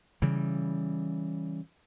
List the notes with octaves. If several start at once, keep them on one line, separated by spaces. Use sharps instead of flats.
C#3 E3 G3